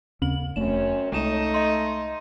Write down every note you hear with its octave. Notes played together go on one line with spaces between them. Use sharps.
D#2 C#3 C4 C#4 F#7
F1 F#2 A3 C4 C#4 E7
C2 G#3 A3 D#4 E7
D#5 C6